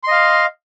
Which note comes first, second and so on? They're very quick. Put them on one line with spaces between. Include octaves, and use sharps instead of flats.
C6 D#5 F5